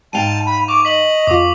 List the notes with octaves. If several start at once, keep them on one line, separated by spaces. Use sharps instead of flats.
G#2 F5 G5 A5 D#7 F7
B5
C#6 D6 F7
D#5 B6 F#7
F2 F4 D6